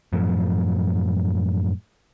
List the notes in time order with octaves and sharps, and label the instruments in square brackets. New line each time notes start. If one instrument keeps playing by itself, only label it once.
[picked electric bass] F#2 A2 F3